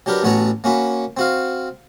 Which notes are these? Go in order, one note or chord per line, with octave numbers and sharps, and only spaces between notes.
F#3 D4 G4 A#4 B4
A1 B3 F#4 C#5 A5 A#5
A#3 C#4 F#4 B5
C4 F#4 F5